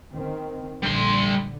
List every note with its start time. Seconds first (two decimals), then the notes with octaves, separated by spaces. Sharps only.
0.12 D#3 C4
0.83 A#1 D3 G3 C6